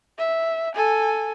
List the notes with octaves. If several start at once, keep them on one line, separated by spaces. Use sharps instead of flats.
E5
A4 G#5